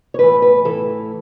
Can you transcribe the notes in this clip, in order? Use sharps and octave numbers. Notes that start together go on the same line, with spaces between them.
C#5
A2 E3 B4
B4
A2 E3 A4